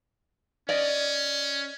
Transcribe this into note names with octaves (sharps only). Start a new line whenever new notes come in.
C#4 D5 D#5